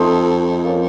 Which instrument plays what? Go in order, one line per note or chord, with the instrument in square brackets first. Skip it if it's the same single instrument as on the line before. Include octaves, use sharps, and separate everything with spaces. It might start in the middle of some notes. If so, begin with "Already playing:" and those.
Already playing: [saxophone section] F2 [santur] A3 D#4 A4 C5
[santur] F3 A#3 C#4